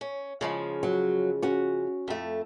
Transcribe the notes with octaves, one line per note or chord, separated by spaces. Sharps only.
C#4
C#3 F3 G#3
F#3
C#4 F#4
F2 A3